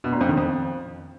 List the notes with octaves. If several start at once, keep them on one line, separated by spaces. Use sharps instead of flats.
B2
A#2
F2
D#3
F2